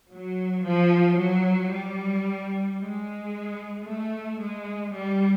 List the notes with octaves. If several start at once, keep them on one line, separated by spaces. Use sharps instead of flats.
F#3
F3
F#3
G3
G#3
A3
G#3
G3